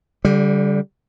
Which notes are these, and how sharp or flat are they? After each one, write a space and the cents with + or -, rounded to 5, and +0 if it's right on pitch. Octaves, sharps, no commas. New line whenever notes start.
D3 -30 G3 +0